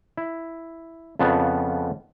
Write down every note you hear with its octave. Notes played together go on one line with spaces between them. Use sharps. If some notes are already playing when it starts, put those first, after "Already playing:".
E4
F2 C#3 F3 B3 F#5 A5